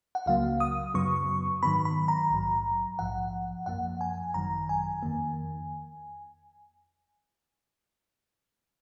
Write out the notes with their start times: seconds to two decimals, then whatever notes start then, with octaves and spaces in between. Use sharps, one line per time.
0.15 F#5
0.26 C#2 C#3 F#3 A#3 F5
0.60 D#6
0.94 F#2 C#3 F#3 B3 C#6
1.63 G#2 D#3 F#3 B3 B5
1.85 B5
2.08 A#5
2.30 A#1 G#2 F#3
2.99 A#1 G#2 F3 F#5
3.66 F#2 F3 A#3 F#5
4.01 G#5
4.34 G#1 F#2 D#3 F#3 A#5
4.69 G#5
5.03 F2 D#3 A#3